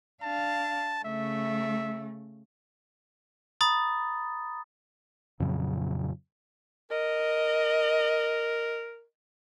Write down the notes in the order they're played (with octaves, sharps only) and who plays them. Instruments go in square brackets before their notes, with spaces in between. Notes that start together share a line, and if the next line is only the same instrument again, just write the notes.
[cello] D4 F5 [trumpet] A5
[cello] C#3 A3 [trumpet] E5
[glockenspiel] A#5 B5 D#6 A6
[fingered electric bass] F2 A#2 C#3 F#3
[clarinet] A#4 [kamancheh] D#5